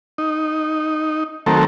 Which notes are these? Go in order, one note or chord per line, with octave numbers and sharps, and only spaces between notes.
D#4
D#3 F#3 A3 C4 A4 A#4